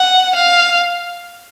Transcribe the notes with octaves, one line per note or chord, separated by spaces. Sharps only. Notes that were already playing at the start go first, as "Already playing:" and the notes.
Already playing: F#5
F5